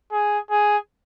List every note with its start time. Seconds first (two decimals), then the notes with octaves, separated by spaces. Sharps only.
0.12 G#4
0.50 G#4